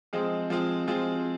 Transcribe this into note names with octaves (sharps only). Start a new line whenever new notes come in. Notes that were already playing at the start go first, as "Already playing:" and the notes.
F3 G#3 C4 F4 G#4
F3 G#3 C4 F4 G#4
F3 G#3 C4 F4 G#4